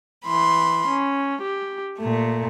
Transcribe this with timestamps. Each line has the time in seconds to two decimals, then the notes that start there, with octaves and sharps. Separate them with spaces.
0.26 E3 B5 C6
0.87 C#4
1.41 G4
2.00 A#2 A3